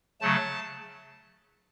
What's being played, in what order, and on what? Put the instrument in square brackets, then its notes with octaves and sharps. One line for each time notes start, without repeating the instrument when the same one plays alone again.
[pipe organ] C#3 F#3 A3 A5